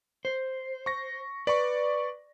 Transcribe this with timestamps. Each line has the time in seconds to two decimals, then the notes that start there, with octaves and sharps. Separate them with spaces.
0.25 C5
0.86 C#6 A#6
1.47 B4 D5 C#6